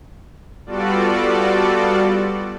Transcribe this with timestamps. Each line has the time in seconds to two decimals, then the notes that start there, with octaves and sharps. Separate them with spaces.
0.66 G3 B3 F4 F#4 A4 D5